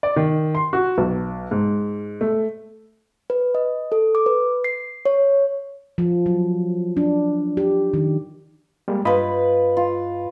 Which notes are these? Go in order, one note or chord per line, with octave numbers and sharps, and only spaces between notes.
D5
D#3
C6
F#4
B1
G#2
A3
B4
D#5
A4
D6
B4
C7
C#5
F3
F#3
D4
G4
D#3
G3 G#3 A#3
G2 F4 B4 D#5 B5
F4